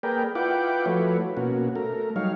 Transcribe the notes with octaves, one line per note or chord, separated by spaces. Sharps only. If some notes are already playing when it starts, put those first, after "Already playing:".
A#3 G#4 A#4 B4 D5 G5
E4 F4 B4 F#5 G5 D6
F3 A3 E4 F#4 B4 C#5
B2 A#3 C#4 F#4
A3 A#4
F#3 G3 D#4 C#5 F5